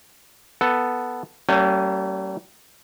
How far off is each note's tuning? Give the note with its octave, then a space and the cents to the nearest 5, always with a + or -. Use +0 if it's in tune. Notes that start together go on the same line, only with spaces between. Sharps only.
B3 +0 A4 +0
G3 -40 A#3 -45 C#4 +0